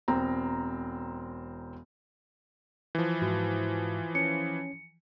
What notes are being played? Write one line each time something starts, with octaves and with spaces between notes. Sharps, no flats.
E1 C4 A#5
E3 F3
G#2 F#4
C#4 C#7